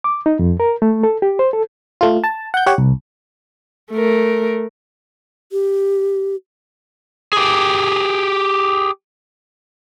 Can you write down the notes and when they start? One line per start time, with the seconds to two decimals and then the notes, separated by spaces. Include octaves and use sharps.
0.04 D6
0.26 D#4
0.39 F2
0.60 A#4
0.82 A3
1.03 A4
1.22 G4
1.39 C5
1.53 A4
2.01 A3 F4
2.24 A5
2.54 F#5 G6
2.66 G4 C#5 F#5
2.78 C2
3.92 A3 A#4
5.52 G4
7.33 G4 G#4